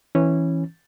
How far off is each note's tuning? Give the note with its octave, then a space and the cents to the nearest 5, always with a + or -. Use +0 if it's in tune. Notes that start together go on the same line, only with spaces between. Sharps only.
E3 -5 C#4 -15